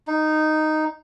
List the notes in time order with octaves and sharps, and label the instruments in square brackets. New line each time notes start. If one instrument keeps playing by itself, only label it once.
[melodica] D#4